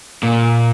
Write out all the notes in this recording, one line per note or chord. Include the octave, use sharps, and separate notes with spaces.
A#2